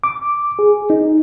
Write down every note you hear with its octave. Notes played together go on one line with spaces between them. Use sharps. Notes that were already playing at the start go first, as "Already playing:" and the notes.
D6
G#4
D#4